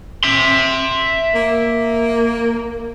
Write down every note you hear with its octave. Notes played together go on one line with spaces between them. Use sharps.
E5 C6
A#3